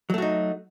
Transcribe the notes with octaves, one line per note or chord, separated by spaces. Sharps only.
F#3 A3 D#4 F#4